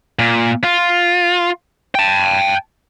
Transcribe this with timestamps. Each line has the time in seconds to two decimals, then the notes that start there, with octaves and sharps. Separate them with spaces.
0.19 A#2
0.64 F4
1.95 G5 A5